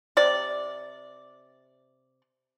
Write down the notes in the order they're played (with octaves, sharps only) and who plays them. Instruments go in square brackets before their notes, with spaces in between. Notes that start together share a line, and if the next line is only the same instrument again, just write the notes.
[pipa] C3 D5